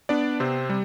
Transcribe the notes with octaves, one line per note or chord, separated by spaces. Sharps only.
B3 D4 D5
C3 C4 C5
G3